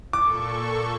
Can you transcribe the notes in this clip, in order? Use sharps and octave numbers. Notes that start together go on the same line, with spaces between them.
A#2 A4 C#6 D6